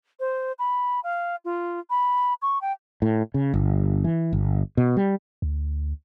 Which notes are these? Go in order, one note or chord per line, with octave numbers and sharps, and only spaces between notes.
C5
B5
F5
F4
B5
C#6
G5
A2
C#3
G1
E3
G1
B2
G3
D2